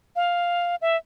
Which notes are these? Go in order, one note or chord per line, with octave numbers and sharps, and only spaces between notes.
F5
E5